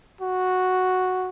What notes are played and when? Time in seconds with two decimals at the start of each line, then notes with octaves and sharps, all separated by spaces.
0.21 F#4